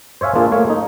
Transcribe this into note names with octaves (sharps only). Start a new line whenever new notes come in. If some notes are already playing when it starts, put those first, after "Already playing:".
C5 C#5 E5 F5 G#5
A#3 D4 F4 G#4
A3 A#3 C#5 F5
D#4